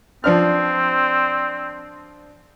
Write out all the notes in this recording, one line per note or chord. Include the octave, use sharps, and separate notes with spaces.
F3 C4 D4 F6